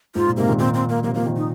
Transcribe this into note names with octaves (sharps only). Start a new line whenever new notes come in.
G#2 F4
A#2
G#2 C3 A#3
A#2 D#3
A#2 D#3 C4
C4
A#3
C3 F3 A#3
F3 A#3
A#2 D#3
D#4